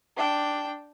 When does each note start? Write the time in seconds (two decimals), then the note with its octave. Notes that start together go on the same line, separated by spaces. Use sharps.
0.17 D4 G5